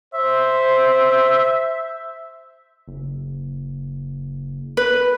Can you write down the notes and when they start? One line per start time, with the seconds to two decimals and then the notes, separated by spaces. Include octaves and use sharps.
0.14 C5 E5
2.88 F#1
4.77 B4